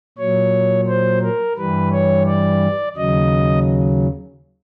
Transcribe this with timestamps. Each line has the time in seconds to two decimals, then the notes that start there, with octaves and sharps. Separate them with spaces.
0.18 A#2 F#3 C#5
0.87 C5
1.22 A#4
1.57 G2 E3 G3 B4
1.92 C#5
2.26 D5
2.96 D#2 C#3 F#3 D#5